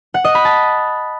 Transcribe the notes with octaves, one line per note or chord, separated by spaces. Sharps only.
F#5
D#5
B5
A5